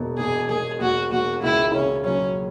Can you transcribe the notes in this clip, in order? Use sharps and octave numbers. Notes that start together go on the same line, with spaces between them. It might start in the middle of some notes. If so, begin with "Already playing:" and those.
Already playing: E1 B2
E2 G#4
E1 G#4
E1 F#4
E1 F#4
C#2 E4
C#3 C#4
F#3 C#4